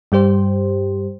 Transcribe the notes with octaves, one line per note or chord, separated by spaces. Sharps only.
G2 G3 G4 C5